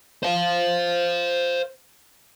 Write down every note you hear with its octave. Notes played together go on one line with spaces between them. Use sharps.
C5 F5